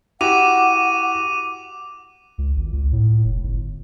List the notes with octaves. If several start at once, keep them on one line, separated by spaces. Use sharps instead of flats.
E4 F#4 G4 F#5 D6 D#7 F7
C#2
G#1
C#2
A2
F1
G1